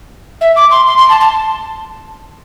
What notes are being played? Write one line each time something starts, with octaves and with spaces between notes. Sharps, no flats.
E5
D6
C6
C6
C6
A5
A5